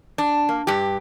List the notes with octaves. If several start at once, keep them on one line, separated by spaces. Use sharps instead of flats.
D4
A#3
G2 G4